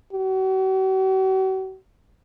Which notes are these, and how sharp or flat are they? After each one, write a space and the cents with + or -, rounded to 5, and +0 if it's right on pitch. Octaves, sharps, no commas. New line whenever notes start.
F#4 +45